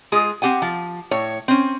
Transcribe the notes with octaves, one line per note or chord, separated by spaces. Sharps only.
G#3 F4 G#4
C4 G4 F#5 G#5
F3
A2 C#5
C4 C#4